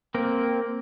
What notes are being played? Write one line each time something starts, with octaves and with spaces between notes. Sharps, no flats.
A#3 C4 A#4